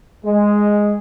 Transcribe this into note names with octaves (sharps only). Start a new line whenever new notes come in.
G#3